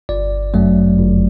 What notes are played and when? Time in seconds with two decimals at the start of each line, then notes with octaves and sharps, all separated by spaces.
0.09 G1 D5
0.54 F#2 F#3 A3
1.00 G1